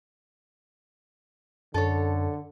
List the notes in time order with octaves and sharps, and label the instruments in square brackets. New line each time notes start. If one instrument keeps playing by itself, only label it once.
[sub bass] F#2 [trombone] D3 [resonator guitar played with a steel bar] A4 C#5